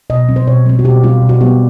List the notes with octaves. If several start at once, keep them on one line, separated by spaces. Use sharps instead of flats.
B2 D#5
G3 C4
C5
B2 C#5
G3 C4
F#4
B2 G4
G3 C4 F4
B2
F#4
G3 B3 G4